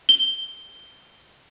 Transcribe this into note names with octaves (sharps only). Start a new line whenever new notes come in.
G7